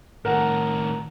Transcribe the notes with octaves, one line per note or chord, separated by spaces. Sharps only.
A2 D#3 A#4 F#5